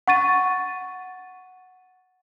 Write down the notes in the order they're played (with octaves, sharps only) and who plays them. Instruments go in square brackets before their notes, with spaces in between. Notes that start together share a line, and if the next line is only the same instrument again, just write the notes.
[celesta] F#5 C#6 A6 D#7